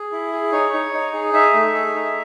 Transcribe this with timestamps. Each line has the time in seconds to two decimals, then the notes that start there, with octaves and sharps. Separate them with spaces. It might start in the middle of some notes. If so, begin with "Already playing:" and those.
Already playing: G#4
0.12 E4
0.33 G#4
0.52 D#4 C#5
0.73 D#4
0.93 D#4
1.13 G#4
1.33 D#4 E5
1.54 A3
1.75 G#4
1.95 D#4